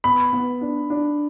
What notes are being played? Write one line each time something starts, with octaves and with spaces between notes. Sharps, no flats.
B3 B5
B3
D4
D4